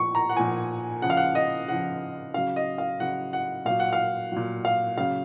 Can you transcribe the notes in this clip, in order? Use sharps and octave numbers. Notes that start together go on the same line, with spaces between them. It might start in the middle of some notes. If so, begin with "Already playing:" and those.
Already playing: A#2 F3 C#6
A#5
F#5
A#2 F3 G#5
C#3 F3 F#5
F5
F#5
D#5
C#3 F3 F#5
C#3 F#3 F5
D#5
F5
C#3 F#3 F#5
F#5
A#2 F#3 F5
F#5
F5
A#2 F#3
F5
C#3 F#3 F5